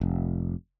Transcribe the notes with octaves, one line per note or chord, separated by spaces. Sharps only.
F1